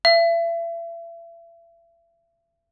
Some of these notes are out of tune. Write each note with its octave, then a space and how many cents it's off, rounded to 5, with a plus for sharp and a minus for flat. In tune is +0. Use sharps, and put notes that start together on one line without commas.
E5 +35